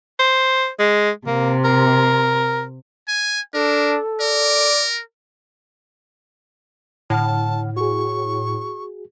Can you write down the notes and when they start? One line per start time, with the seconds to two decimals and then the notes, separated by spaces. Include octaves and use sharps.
0.19 C5
0.79 G#3
1.27 C3 A#3
1.65 A#4
3.08 G#5
3.54 D4 A4 A#4
4.21 A#4 D5
7.10 A2 D3 F#5 A5 F6
7.77 F#4 G#4 C#6